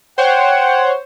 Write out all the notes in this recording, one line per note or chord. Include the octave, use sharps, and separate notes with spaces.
C5 C#5 F#5 G5